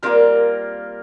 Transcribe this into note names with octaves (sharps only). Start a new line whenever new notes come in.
G3 A#3 C4 F4 A#4